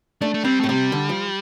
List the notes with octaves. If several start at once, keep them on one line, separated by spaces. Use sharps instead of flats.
A3 D4
A3
G3 C4
A3
A2
C3 G3
D3
F3